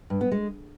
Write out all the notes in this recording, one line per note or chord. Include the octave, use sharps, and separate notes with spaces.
G2
B3
G#3